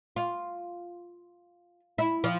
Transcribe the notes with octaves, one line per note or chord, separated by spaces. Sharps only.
F4
E4
F3